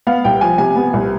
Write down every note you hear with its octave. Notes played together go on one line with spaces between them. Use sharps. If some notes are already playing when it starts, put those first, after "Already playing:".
B3 F5
C2 G5
F3 G#5
C3 G#5
B3
C2